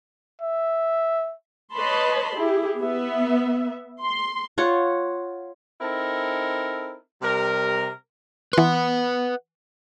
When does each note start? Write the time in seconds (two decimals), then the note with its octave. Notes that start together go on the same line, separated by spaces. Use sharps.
0.42 E5
1.73 B4 C#5 D#5 A5 B5 C6
2.35 E4 G4 G#4
2.79 B3 E5
4.03 C6
4.58 F4 C#5 F#5
5.81 C4 D#4 E4 A4 A#4
7.22 C3 G3 A#4
8.53 E3 B4 F#5 C6